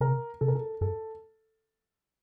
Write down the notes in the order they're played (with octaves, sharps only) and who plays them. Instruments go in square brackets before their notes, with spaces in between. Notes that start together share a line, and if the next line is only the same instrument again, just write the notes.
[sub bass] C3 [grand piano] A#4
[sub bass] C3 [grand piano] A4
[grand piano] A#4
A4
[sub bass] F#2 [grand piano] A4